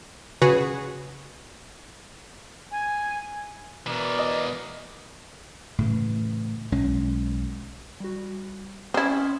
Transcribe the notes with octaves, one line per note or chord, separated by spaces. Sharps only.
C#3 F#4 G#4 B4 C#5
G#5
B2 E3 A#4 D5
D#5
A2 C#3 E3
B1 G#3 C#4
G3 F#4
C4 C#4 E4 C6 D#6 F6